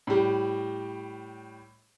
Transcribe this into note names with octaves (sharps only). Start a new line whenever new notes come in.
A2 G3